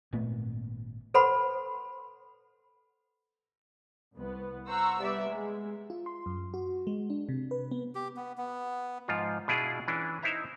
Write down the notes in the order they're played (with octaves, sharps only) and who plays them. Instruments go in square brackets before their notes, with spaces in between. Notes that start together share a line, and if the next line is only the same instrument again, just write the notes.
[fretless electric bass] G#1 A#2 A3 B3
[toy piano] A4 B4 C5 F#5 B5 C6
[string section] C2 B3
C5 F#5 A#5 C#6 E6
G3 B3 D5 E5
G#3
[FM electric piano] F4
C6
F#2
F#4
G#3
D4
C3
B4
B3
[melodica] G4
B3
B3
[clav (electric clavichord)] G#2 F3 F4
B2 D4 E4 F4 G#4
E3 C#4 D4
D#4 E4 C5 E5 A#5